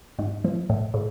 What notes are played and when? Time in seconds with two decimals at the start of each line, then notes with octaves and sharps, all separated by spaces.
0.19 G#2
0.44 F3
0.70 A2
0.94 A2